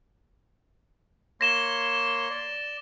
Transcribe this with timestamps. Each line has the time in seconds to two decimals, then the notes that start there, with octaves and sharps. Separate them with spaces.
1.41 A#3 C#5 C6 A#6 E7 G7
2.30 D5